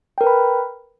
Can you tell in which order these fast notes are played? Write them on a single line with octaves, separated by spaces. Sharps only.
G5 A#4 B4 B5